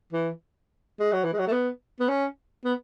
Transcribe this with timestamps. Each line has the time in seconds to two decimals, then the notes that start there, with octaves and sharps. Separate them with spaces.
0.13 E3
1.00 G#3
1.12 F#3
1.24 E3
1.33 G#3
1.39 F#3
1.48 A3
1.52 B3
2.00 B3
2.09 C#4
2.65 B3